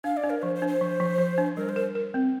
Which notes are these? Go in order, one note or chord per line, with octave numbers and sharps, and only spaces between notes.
D4 F5
D5
D4
A#4
F3 C5
C5
D4
C5
F3
F3
F3
D4
G3 A#4
C5
A#4
A#4
C4